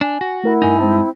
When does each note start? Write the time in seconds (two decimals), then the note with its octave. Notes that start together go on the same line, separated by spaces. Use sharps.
0.01 D4 G#5
0.21 F#4
0.44 A3 E4 A#4 F#5
0.62 G2 D#4 G#5
0.80 G#3 C4 A5